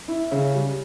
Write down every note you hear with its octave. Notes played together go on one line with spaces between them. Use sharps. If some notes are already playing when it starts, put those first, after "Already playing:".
E4
C#3
G3